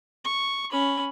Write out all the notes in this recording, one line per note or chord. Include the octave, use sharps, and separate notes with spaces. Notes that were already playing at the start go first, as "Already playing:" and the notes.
C#6
C#4 B5